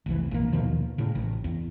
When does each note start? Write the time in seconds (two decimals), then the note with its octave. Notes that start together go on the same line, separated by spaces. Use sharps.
0.06 F1 C2 E3
0.31 A#1 A#3
0.53 D#2 B2 D#3 F3
0.98 A2 C#3
1.15 A1
1.44 E2